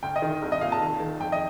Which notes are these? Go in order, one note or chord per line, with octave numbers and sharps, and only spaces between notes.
D2 G5
D#5
D#3
C2
D#5
A#2 F5
A5
D#3
D#3
F2 G5
D#5